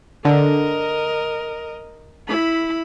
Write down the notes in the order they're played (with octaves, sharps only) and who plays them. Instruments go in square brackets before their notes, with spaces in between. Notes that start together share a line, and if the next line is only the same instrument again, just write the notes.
[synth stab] D3 [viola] A#4 D#5
[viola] E4 B5